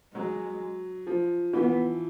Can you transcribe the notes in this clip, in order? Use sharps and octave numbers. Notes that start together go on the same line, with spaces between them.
F#3 G#3
F3
E3 B3